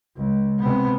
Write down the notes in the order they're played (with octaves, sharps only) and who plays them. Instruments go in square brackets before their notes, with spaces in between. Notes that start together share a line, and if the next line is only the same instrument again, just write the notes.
[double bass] C#2
C3 B3